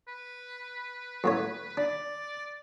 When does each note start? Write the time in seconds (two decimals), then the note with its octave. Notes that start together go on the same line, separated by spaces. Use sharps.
0.08 B4
1.24 F#2 A2 C#5
1.77 D4 D5